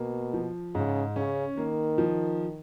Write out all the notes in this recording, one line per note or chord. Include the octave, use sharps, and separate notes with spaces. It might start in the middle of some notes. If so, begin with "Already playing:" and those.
Already playing: B2 A#3
F3
G#2 C#3
C#3 C#4
D#3 A#3
F3